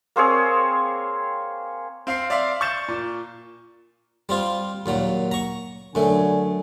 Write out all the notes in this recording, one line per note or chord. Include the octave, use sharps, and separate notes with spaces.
A#3 C4 G#4 C#5
C4 F5 C6 C7
D5 E5 F5 C6
C#6 G6 A6 E7
A#2
G3 C4 F4
D#2 A#2 F#3
A#5 C#6
F#2 D3 A3 G#5